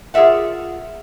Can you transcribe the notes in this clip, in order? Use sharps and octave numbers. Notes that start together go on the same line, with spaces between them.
F4 G#4 A#4 D5 E5 F#5